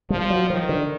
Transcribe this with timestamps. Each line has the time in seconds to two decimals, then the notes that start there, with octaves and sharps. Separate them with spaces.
0.10 F3 G3
0.30 F#3
0.50 D#3 F3
0.69 D3